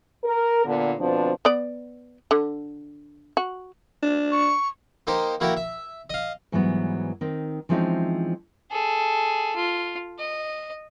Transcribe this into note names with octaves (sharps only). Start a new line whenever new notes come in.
A#4
A#2 D3 B3
D2 B2 F3 C4 D4 B4
B3 D5
D3
F#4
D4
C#6
A#3 D#4 G4 C5
A#3 E4 F#4 G4 A#4
E5
D#5 F5
G#2 E3 F#3 G3 B3
D#3 C4 D#4
E3 F3 G#3 C4 C#4 D#4
G#4 A4
F4
D#5